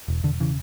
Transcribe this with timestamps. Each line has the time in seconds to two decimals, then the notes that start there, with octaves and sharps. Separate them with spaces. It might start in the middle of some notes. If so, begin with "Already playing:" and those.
0.08 E1
0.24 E1 D3
0.40 C#3 E3